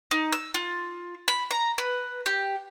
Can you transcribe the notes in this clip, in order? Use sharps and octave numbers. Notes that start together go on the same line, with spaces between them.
D#4
E6
F4
B5
A#5
B4
G4